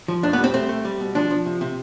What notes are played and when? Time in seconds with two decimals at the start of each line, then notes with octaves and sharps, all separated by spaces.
0.08 F3
0.23 F2 D4
0.33 B3
0.38 G3
0.44 C4
0.54 A3 C4
0.69 A3
0.85 G3
1.00 B2
1.15 F3 D4
1.30 F3
1.46 C3
1.61 C3